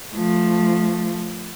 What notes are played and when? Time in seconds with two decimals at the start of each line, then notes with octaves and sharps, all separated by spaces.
0.14 F3 A3